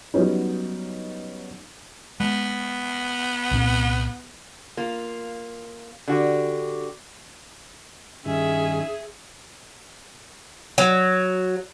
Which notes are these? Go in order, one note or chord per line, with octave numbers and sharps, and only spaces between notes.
F#3 G3 B3 C#4 D#4
G#3 B3
C2 A#2 C4
A#3 F4
D3 F#4 G4
G2 D#3 C#4 G#4 E5
F#3